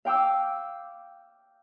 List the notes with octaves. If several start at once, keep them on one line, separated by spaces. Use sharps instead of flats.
F5 G5 D6 E6